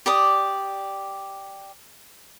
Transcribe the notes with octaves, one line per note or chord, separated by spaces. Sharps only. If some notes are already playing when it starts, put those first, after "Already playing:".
G4 D5 D#6